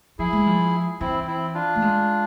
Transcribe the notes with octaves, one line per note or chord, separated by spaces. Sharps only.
F3 E4 G#4
G#3
F3
E3 C4 E4
C4 E4
D4 F4
A3
G#3